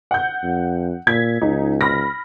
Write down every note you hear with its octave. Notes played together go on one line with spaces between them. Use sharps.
F#5 G6
F2
A#2 G#6 B6
C#2 D#4
B5 F6 A#6